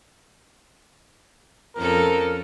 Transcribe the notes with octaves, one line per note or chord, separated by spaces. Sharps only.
F2 C#4 A4 A#4